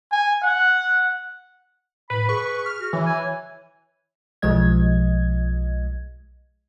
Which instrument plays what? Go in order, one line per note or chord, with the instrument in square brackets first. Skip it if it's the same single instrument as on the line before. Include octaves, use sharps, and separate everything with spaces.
[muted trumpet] G#5
F#5
[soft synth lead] A2 [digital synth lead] B4 [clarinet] B5
[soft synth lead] G#4 [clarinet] B4 [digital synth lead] C#6
[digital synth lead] F6
[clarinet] F#4
[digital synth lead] E3 [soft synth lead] C#5
[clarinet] G#5
[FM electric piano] B1 F3 G#3 D#5 G#6